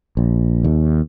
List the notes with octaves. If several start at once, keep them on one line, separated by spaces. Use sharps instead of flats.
A#1
D#2